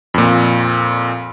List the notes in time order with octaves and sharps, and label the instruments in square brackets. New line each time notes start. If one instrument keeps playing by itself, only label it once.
[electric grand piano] F2 A#2